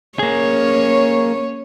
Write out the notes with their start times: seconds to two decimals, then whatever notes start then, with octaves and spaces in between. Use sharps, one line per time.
0.19 A#3 C#4 G#4 C#5